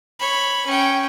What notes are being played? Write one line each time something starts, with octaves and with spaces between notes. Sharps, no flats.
C#5 B5
C#4 G5